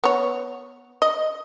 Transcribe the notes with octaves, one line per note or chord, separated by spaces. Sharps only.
B3 C#5
D#5